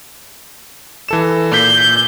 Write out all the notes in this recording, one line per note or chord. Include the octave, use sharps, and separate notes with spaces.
E3 A4 E7
A#2 G6 B6 C7